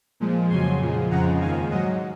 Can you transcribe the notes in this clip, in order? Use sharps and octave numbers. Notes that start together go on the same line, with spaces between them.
A#2 F3 G#3
F2 C#3 F#3 G#5 C6
A#2 F3 G#3
F2 C#3 F3 G#3 F#5 A#5
D#2 D#3 G#3 F5 G#5
G#2 F#3 D#5 F#5